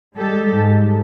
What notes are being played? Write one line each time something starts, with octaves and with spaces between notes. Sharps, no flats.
G3 G#3 G4 A4
G#2